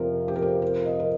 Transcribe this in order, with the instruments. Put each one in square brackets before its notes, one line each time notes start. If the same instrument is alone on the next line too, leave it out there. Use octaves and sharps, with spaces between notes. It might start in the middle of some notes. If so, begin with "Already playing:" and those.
Already playing: [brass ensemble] F2 C3 F3 [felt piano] A#4
[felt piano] G4
A#4
G4
A#4
D#5
A#4